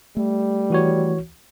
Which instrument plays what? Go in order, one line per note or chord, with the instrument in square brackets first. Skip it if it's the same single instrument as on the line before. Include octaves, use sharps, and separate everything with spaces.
[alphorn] G3 [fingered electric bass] A3
[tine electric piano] E3 F#4 C#5